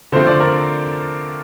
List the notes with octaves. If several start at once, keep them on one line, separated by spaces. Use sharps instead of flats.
D3 F3 A3 C4 C5
D5
A#4